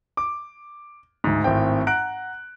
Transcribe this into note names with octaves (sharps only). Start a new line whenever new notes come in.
D6
D2 G#2
G#1 A2 C4 G5
F#5 A#5 F#6 D7